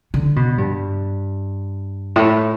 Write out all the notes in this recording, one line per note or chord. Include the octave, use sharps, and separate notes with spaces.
D3
B2
G2
A2